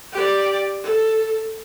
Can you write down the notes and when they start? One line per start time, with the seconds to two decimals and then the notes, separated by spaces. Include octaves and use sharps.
0.12 G4 D5
0.83 A4